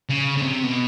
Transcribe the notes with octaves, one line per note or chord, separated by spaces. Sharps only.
C#3
C#3
C3
B2